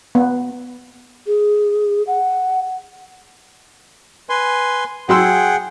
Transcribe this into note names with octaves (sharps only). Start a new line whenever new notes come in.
B3
G#4
F#5
B4 G#5 C6
F#3 G#4 F#5 G5 C6 E6